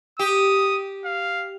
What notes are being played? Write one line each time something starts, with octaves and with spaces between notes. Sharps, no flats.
G4 D#6
F5